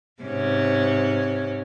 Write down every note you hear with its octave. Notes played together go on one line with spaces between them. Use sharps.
G#2 C3 C#4